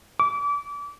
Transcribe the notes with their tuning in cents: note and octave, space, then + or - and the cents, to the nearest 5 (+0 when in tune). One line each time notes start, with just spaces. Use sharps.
D6 -30